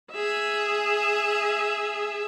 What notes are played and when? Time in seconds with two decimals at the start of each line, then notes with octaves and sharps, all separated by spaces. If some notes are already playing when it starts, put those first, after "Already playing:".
0.12 G#4 E5